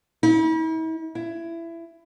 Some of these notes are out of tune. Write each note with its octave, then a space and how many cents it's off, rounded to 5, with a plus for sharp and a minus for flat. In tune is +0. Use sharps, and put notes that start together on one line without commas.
E4 -45
E4 +20